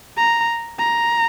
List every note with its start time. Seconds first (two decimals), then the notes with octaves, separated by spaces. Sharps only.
0.17 A#5
0.79 A#5